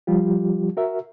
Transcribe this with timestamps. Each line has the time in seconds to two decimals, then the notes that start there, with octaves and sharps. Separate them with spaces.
0.07 F3 G3 F4 G4
0.77 F#4 A#4 E5